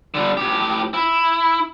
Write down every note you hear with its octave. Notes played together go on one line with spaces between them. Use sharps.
D3 G3
A2 G4
E4